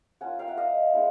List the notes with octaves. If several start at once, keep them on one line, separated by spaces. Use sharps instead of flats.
A#3 C#4 F4 F#5 G#5
F5 G5
E5 F#5
D#5 F5
G#3 B3 E4